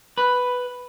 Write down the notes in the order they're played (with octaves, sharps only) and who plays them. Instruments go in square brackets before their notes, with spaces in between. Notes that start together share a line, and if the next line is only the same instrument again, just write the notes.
[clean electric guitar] B4